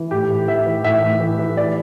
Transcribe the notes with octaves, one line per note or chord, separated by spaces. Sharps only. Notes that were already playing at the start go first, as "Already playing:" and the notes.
Already playing: E3
A2 G4
A2
E3 E5
E3
A2 E5
A2
E3
E3
D5